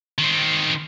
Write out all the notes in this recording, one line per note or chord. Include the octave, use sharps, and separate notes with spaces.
D#3 C4